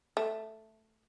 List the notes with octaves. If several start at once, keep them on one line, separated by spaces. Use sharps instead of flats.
A3